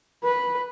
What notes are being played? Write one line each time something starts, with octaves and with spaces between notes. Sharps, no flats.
B4